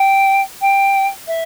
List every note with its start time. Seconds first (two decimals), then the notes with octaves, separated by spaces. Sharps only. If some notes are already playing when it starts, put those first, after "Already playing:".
Already playing: G5
0.61 G5
1.27 E5